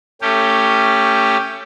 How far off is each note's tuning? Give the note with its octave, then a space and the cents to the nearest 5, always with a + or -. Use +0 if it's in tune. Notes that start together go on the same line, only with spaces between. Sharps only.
A3 +25 C#4 +0 G4 +5